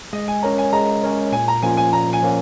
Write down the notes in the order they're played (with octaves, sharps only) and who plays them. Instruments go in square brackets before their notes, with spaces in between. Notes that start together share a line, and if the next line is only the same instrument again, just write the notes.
[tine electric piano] G#3 [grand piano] D#5
[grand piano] G#5
[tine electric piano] C#4 A#4 C#5 [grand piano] A#5
[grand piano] G#5
[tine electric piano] G#3 [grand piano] A#5
[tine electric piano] C#4 A#4 C#5
[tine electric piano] A#2 [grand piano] G#5
[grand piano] A#5
[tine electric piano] F3 A#3 C#4 F4 [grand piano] G#5
[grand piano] G#5
[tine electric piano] A#2 [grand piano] A#5
[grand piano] G#5
[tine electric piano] F3 A#3 C#4